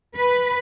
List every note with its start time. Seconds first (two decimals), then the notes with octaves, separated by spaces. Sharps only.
0.17 B4